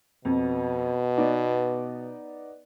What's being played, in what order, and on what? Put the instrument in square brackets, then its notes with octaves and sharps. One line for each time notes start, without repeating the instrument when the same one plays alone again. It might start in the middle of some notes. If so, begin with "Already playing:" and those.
[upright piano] F2 [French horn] B2
[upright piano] B3 D#4 D5